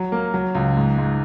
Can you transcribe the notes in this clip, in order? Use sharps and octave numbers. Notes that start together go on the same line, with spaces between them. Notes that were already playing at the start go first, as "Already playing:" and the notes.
Already playing: F#3
A#3
F#3
C#2
G#2
G#2